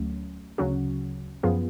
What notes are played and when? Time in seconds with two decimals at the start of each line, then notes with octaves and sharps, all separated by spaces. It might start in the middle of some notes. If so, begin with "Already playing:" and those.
Already playing: D2 F#3 A3 C#4
0.58 D2 C#3 F#3 C#4 F#4
1.43 F#2 F3 B3 F4 G#4